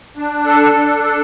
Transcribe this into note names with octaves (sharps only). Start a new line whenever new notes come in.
D4
A4
D4
A4